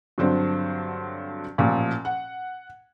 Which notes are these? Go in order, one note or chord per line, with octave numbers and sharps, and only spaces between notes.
G2 D3 F#3 C4 D4
A1 A#2 F3
F#5